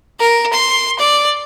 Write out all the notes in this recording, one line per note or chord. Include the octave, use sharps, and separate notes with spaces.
A#4
C6
D5